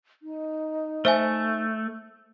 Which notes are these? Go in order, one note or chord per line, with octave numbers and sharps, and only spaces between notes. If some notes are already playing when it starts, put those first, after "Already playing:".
D#4
A3 C5 E5 G#5